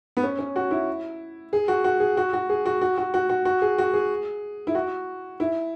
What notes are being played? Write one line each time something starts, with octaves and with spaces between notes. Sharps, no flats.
B3
C#4
C#4
F#4
E4
G#4
F#4
F#4
G#4
F#4
F#4
G#4
F#4
F#4
F#4
F#4
F#4
F#4
G#4
F#4
G#4
E4
F#4
E4